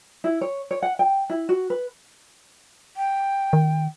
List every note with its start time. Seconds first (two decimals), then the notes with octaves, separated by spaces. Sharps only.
0.24 E4
0.41 C#5
0.71 C#5
0.83 F#5
0.99 G5
1.30 E4
1.49 F#4
1.70 B4
2.97 G5
3.53 D#3